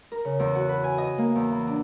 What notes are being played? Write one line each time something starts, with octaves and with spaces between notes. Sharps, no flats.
A#4
C#3
E2
F#4
B4
G#5
D#5
A#3
E2
E3
D4